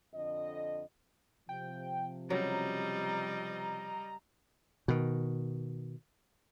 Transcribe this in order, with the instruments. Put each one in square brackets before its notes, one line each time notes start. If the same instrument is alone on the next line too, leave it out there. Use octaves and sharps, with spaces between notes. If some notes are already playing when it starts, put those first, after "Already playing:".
[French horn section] F2 D3 D#5
[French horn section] C3 F3 [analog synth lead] G5
[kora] C#3 F#3 [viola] G3 D#5 [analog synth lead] A#5
[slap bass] B2 D#3